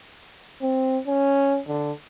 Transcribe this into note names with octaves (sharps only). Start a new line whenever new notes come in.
C4
C#4
D3